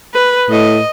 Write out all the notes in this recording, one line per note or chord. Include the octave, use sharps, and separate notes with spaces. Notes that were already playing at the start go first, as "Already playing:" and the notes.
B4
A2 D#5